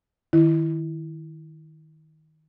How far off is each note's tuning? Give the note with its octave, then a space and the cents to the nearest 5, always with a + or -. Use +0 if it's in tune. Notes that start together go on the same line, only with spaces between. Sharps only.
D#3 +0 E4 +0